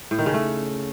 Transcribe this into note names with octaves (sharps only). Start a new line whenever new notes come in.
A2
D#3
C#3
A3